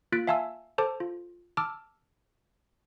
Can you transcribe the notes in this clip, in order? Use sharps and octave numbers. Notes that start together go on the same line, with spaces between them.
A#3 F4 F#6 A6 B6 D7
E5 F5 G#5 A5 C6 E6
A4 C5 A5 D6
F4
A5 D6 E6 F6